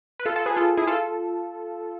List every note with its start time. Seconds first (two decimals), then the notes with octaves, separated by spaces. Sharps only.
0.19 B4
0.25 F4 A4
0.36 F4 A4
0.46 G#4 B4
0.56 F4 A4
0.77 E4 G#4
0.87 F4 A4